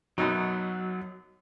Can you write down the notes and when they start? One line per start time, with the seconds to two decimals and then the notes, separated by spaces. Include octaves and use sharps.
0.18 F#2 B2 F#3 D#4